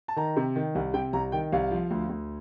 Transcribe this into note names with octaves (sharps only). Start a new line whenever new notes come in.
A5
D#3 A#5
C3
D#3
C2
C3 G5
C2 A#5
D#3 G5
C2 F5
F3
D2
D2